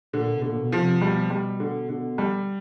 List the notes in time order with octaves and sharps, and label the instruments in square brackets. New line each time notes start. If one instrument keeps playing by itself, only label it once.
[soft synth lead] A#2 [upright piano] D3
[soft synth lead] B2
[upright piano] D3
[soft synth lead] A#2
B2
[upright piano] F3
[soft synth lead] C3
[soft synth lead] B2 [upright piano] G3
[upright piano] G3
D3
D3
G3